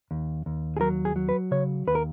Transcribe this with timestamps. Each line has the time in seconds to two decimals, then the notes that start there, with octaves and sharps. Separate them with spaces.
0.11 D#2
0.46 D#2
0.77 G#4
0.81 F#3 A#4
1.05 G#4
1.16 F#3
1.29 B4
1.51 C#3 C#5
1.87 D#2 B4
1.95 A#4